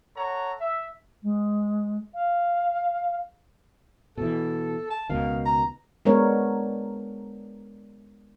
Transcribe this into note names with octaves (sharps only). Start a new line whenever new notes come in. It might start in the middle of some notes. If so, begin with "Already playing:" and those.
A4 C#5 F#5 A#5
E5
G#3
F5
B2 E3 A4
A5
C#2 B2 D#3 F5
A#5
G#3 B3 D4 A#4 C#5